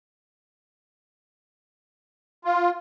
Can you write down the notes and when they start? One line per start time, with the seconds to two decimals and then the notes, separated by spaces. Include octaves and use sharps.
2.45 F4